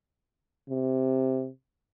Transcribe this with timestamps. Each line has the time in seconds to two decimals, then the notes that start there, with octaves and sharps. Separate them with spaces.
0.69 C3